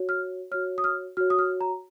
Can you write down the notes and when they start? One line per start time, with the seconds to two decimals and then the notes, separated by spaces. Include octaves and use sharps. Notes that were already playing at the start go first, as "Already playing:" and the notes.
Already playing: F#4 C#5
0.09 F6
0.51 F#4 C#5 F6
0.78 D#6
0.84 F6
1.17 F#4 C#5 F6
1.30 D#6
1.39 F6
1.61 A#5